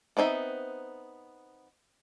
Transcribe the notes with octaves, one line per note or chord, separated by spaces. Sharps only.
B3 C4 D#4 C5 E5